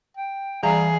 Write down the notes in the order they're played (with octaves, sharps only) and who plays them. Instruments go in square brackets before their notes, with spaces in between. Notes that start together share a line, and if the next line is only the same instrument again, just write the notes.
[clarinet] G5
[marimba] E3 F5 [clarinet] G3 [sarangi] G#4 [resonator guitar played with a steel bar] A#5